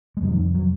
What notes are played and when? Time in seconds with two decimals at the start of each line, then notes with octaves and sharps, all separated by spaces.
0.17 G#3
0.22 F2 C3 F#3
0.33 D#3
0.54 F#3